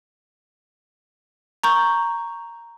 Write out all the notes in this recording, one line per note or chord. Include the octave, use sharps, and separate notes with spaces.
A#5 C#6 G6